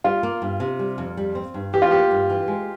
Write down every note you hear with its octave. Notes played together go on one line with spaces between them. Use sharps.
G3 F4
A#3
G2
C3
G3
F2
G3
C4
G2
E3 G4
F4
A#3 G4
G2
E3
G#3